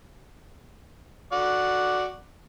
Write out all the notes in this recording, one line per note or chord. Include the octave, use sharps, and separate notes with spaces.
F#4 D5